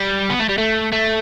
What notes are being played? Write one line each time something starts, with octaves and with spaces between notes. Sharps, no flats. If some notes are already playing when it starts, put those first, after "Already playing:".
Already playing: G3
B3
A3
G3
A3
A3